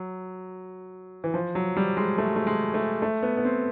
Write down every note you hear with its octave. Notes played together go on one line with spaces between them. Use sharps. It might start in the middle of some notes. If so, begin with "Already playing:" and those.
Already playing: F#3
E3
F3
F#3
G3
G#3
A3
A3
G#3
A3
A3
B3
B3
C4